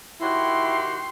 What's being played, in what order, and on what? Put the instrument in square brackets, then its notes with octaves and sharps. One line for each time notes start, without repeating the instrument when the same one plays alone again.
[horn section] D#3 F#4 G4 [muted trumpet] E4 [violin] C6